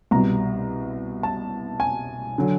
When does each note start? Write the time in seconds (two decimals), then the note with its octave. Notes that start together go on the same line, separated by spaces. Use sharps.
0.11 C2 B2 G3 A#5
1.23 A5
1.80 G#5
2.38 D3 F#3